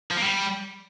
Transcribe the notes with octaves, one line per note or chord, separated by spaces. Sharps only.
F3
A#3
G3